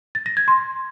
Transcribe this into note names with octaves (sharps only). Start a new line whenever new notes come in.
A6
A#6
G#6
C6